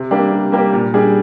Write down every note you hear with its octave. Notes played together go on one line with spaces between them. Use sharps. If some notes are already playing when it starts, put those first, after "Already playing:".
Already playing: C3
G3 A#3 D4 G4
C3
G3 A#3 D4 G4
A#2
G3 D4 G#4